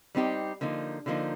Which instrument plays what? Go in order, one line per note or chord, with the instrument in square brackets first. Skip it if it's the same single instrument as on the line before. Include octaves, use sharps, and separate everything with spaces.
[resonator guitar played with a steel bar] G3 C4 D#4 G4
D3 F3 A#3 D#4
D3 F3 A#3 D#4